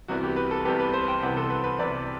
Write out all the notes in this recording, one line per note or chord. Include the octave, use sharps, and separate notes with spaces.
C2 C3 E3 B3 F#4
G4
B4
A4
C2 C3 E3 B3 G4
B4
C5
G5
C2 C3 E3 B3 F#5
A4
B4
B4
C2 C3 E3 B3 D5